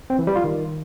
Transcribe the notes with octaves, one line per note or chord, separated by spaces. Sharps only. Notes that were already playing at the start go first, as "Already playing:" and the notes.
C4
E3
G3
F4
D#3